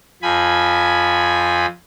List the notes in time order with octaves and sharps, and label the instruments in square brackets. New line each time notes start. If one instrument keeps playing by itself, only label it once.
[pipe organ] F2 F3 G#5 B5